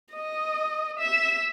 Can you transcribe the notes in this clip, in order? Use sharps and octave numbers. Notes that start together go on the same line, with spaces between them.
D#5
E5